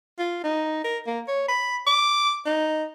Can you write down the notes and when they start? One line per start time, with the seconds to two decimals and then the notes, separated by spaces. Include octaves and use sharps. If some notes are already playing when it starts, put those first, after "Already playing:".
0.19 F4
0.44 D#4
0.85 A#4
1.07 A#3
1.28 C#5
1.48 B5
1.87 D6
2.46 D#4